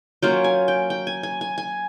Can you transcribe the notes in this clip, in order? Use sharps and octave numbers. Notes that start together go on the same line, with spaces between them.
F#3 A#3 C#4 F4 G5
G#5
G5
G5
G#5
G#5
G#5
G#5